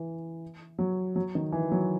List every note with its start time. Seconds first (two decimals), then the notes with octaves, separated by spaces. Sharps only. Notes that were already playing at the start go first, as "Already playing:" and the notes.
Already playing: E3
0.79 F#3
1.16 F#3
1.35 D#3
1.52 E3
1.71 F#3